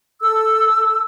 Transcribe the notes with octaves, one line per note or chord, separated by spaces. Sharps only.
A4 E6